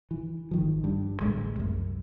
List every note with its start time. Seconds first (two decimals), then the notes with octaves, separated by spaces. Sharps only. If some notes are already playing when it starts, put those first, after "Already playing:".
0.11 E3
0.51 G#1 D#3 F3
0.84 G2
1.21 A1 D2 G#3
1.56 C2 F#2